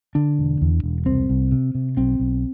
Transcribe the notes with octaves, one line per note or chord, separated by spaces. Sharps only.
D3 D4
E1
E2
E1
C2 C4
C2
C3
C3
B1 C4
B1